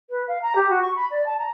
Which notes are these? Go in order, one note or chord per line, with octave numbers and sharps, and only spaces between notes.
B4
F5
A#5
G4
F#4
C#6
B5
D5
A5
A#5